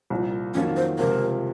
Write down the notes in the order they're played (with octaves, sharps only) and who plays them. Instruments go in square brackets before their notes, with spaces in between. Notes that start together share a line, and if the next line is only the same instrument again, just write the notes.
[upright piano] C2 A#2 F3
[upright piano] F2 D#3 F#3 A#3 F4 [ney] C#4
[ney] C5
[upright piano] C#2 C3 F3 [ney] A#4